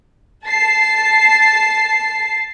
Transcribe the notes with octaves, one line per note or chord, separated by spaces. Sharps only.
A5 C7